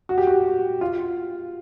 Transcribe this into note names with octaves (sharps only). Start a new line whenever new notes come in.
F#4
G4
F#4
F4